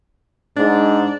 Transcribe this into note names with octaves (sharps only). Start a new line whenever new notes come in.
G#2 D4